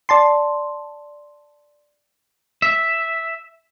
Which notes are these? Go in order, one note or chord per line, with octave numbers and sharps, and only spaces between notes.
D5 A5 C6
E5